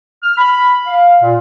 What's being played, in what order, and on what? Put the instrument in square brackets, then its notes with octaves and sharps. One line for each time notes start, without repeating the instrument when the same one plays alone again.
[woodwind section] F6
B5
F5
A#2